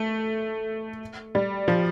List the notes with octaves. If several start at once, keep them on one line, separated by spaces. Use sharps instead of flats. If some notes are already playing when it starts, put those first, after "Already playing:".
Already playing: A3
G3
F3